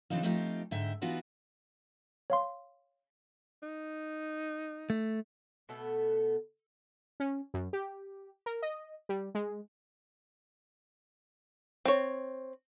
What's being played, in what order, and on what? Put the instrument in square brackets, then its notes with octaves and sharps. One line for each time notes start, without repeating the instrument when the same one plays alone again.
[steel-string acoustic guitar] C#3 E3 C4 D4 D#4 F4
F3 A3 C4 D#4 F4 G4
G#2 D3 E5 G5
E3 B3 D#4 F4 F#4 B4
[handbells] C#5 F5 C6
[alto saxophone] D#4
[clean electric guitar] A3
[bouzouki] B2 A3 B3 A4
[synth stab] C#4
F#2
G4
A#4
D#5
G3
G#3
[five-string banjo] C4 C#5